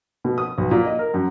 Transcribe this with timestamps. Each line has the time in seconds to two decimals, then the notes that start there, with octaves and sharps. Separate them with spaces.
0.25 B2
0.38 D#6
0.58 B1
0.71 A#2
0.86 D#5
0.99 A#4
1.14 F#2